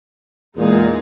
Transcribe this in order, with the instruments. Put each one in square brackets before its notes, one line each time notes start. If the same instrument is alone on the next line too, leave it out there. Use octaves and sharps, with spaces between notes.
[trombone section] E2 A#2 [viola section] G#3 D#4 G#4